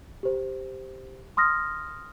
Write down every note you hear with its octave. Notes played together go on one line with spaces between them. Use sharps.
G4 C5
C6 D#6 F6 A#6